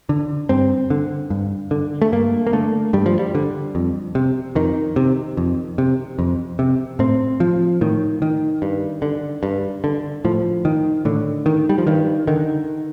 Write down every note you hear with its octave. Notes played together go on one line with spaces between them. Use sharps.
D3
G2 C4
D3
G2
D3
A3
G2 A#3
A#3
D3 A3
G2 G3
F3
G3
D3
F2
C3
F2 D#3
C3
F2
C3
F2
C3
A2 C4
F3
A2 D#3
D#3
G2
D3
G2
D3
A2 F3
D#3
A2 D3
D#3
G3
F3
G2 D#3
D3 D#3